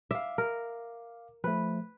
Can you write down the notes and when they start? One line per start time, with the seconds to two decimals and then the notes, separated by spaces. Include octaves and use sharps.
0.11 E5 F5 D6
0.38 A#4
1.44 F3 A3 B4